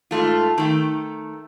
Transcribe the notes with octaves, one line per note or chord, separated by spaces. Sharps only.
G#2 A3 F4
D#3 A3